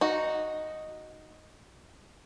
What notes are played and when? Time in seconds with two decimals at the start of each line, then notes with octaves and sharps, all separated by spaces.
0.01 D#4 F#4